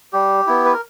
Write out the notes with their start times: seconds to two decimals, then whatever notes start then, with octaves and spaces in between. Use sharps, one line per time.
0.13 G3 G4
0.47 B3 E4
0.65 B4
0.73 A#4